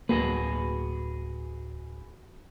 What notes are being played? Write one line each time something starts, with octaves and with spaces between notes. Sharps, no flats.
D1 A#3 F#4 G#4 B4